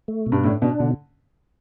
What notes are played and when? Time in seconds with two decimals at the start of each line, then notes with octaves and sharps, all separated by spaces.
0.08 A3
0.26 B2
0.32 G2
0.44 A2 D4
0.62 B2 D4
0.80 B2 D3